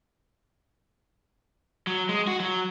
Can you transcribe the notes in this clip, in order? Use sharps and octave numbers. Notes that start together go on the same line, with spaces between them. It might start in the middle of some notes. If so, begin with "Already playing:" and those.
F#3
G#3
F#4
F#3